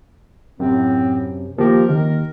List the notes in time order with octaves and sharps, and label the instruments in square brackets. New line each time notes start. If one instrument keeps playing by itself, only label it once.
[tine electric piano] F#2 C3 [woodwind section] A2 C4
[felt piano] D#2 [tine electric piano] F3 G4 [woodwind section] A#4
[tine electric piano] D#2 [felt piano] D#3